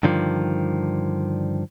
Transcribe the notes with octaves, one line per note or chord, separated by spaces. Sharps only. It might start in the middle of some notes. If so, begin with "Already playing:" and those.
G2 D3 D#3 F3